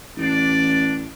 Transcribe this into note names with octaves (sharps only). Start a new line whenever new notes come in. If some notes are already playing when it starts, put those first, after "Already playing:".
A1 D4 D5